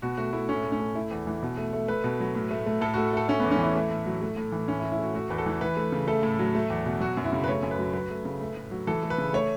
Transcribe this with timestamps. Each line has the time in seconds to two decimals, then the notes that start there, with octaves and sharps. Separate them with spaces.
0.02 B2 F#4
0.17 A3 F#4
0.33 A3 E4
0.49 A2 C#4
0.64 A3
0.72 C#4
0.80 A3
0.95 A3 E4
1.11 E2
1.27 E3
1.43 B2
1.57 A3
1.73 A3
1.88 A3 B4
2.04 B2
2.20 F#3
2.35 A2
2.51 A3
2.66 A3
2.81 A2 A4
2.94 A3 F#4
3.13 A3 A4
3.28 A3 C#4
3.40 E2 B3
3.51 C#4
3.59 E3 E4
3.76 A3
3.91 A2
4.06 F#3
4.22 A3
4.37 A2
4.52 E3
4.68 A2 C#4
4.80 E4
4.84 A3
4.92 E4
4.99 A3 F#4
5.14 A3 F#4
5.30 E2 B4
5.38 A4
5.46 E3
5.61 E3 B4
5.77 A3
5.92 C#3
6.08 A3 A4
6.23 A2
6.39 F#3
6.55 A3
6.70 E2
6.86 B2
7.00 F#3 F#4
7.17 F#2
7.24 E4
7.33 C#3
7.44 B4
7.48 A3 C#5
7.63 F#2
7.71 B4
7.79 F#3
7.93 F#3 B4
8.10 A3
8.25 C#3
8.41 A3
8.56 A2
8.71 F#3
8.87 E3 A4
9.03 A3
9.10 B4
9.18 C#3
9.33 A3 C#5